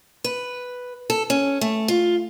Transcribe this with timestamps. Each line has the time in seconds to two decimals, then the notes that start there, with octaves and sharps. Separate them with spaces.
0.24 B4
1.10 A4
1.30 C#4
1.61 A3
1.88 F4